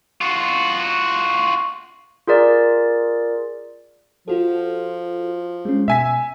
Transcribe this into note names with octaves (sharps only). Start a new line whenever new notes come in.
F4 F#4
F4 G#4 A#4 D5
F3 F4 F#4 A4
G#3 C#4
B2 E5 G#5 E6 B6